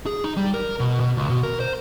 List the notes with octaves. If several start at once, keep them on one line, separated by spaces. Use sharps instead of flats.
G#4
D#4
G3
A#4
B2
B2
C#2
B2
A#4
C5